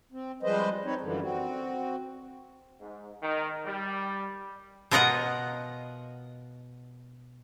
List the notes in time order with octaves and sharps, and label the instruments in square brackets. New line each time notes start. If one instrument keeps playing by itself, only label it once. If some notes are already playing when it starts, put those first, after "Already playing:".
[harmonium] C4
F3 G3 G#3 B4 C5 D#5
C4 D#4 B4 C#5
F#2 D3 E3 F3 G3
C4 F#4
[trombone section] G#2
D#3
G3
[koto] B2 F4 A#4 D#5 F#5 A#5